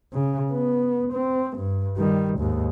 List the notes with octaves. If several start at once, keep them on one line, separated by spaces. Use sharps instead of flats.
C#3
B3
C4
G2
D#3 G3
D#2 G#2